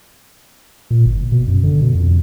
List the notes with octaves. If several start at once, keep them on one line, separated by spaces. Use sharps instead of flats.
A#2
G1
B2
F#2
D3
B2
F2